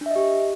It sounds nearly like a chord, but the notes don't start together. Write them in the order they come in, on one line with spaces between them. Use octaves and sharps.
D4 E5 D#5 G4